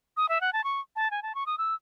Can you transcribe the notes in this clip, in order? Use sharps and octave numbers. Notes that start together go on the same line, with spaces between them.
D#6
E5
F#5
A5
C#6
A5
G#5
A5
C#6
D#6
E6